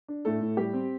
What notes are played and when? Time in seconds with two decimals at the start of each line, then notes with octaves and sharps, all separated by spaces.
0.08 D4
0.25 A2 A3 A4
0.41 A2
0.57 G3 G4
0.73 C4